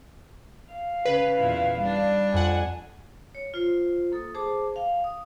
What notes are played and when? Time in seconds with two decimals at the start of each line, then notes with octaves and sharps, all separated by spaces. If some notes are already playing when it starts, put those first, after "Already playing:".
0.73 F5
1.05 C#3 B4
1.37 E2 A#2 E4
1.78 G3 D4
2.34 F2 F#5 G#5
3.35 C#5
3.54 F4 C5
4.12 A#3 A4 D#6
4.35 G#4 C5 A5 D6
4.76 F5 G5
5.04 D#6